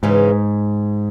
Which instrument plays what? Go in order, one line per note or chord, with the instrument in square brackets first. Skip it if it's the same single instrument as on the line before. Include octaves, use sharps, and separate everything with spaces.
[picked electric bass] G#2 [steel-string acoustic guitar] C#3 E3 G#3 C#4